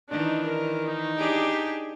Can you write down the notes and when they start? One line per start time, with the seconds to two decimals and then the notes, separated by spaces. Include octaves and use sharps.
0.10 D#3 E3 D4 D#4
0.45 A#4
0.85 D#4
1.18 D4 G4 G#4